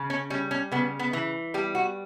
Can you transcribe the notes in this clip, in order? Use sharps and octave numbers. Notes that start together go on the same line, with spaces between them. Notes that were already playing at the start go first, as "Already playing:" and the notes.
Already playing: C#3
C#4
G3 C#4
C#4
C#3 B3
B3
E3
G3 G4
F#4